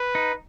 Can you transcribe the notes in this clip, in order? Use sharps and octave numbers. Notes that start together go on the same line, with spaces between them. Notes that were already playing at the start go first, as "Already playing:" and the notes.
Already playing: B4
D#4